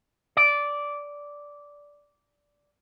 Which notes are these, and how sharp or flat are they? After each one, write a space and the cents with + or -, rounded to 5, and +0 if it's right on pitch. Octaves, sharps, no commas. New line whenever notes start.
D5 -10